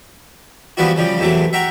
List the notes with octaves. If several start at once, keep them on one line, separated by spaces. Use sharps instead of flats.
E3 F3 G3 B3 E4 F#4
C#3 F3 G3
E2 C3 E3 F#3 A3
E5 F#5 G5 A#5 C#6